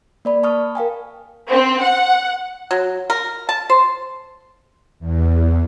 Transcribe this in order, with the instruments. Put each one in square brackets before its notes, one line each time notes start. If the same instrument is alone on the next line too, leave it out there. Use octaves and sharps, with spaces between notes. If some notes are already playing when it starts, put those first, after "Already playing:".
[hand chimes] A#3 D5 B5
A5 C#6 D#6 F6
A#4 F5 G5 G#5
[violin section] C4
F#5
[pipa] F#3
A#4
A5
C5
[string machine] E2